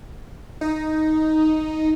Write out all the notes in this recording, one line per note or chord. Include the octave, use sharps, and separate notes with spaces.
D#4